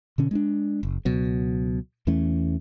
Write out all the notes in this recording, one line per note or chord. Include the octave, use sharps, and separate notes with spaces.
B2 D3 C#4
G#3 C#4 D4
F#1
C#2 B2 F#3
E2 E3 A3 C#4